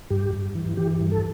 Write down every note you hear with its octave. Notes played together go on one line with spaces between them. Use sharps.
G2 G4
G2
E3
E3 G4
G2
A4